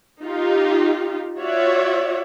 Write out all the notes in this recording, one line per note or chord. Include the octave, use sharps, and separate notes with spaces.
D#4 F4 G4
F4 F#4 C#5 D5 E5